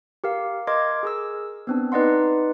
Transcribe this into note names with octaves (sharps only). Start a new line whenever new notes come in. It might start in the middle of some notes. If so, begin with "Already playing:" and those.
G4 A#4 F5
A#4 D#5 C6 D6 G#6
G#4 A#4 E6
B3 C4 D4
D#4 B4 D5 D#5 F#5 C6